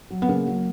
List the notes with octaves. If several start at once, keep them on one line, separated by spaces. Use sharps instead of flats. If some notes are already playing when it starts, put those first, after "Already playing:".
F#3
B3
C#3 A#3
F#3